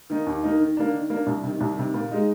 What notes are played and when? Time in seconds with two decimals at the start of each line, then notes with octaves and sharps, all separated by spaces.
0.10 D#3 A#3 D#4
0.26 D#2
0.43 D#3 A#3 D#4
0.60 D#3
0.77 A#3 D4
0.93 D#3
1.10 A#3 D4
1.26 C2
1.43 C3 D#3
1.60 C2
1.77 C3 D#3
1.94 A#2
2.11 G#3 D#4